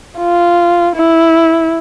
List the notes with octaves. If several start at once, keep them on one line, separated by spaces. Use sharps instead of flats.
F4
E4